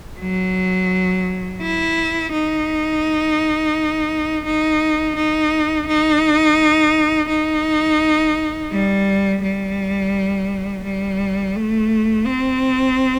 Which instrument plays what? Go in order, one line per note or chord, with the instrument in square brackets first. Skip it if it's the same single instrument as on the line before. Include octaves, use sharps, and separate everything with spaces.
[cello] F#3
E4
D#4
D#4
D#4
D#4
D#4
G3
G3
G3
A3
C4